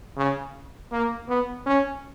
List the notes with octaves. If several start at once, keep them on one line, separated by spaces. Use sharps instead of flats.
C#3
A#3
B3
C#4